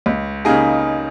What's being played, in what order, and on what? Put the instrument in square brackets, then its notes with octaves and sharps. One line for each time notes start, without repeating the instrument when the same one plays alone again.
[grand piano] C#2
C#3 A#3 D#4 G#4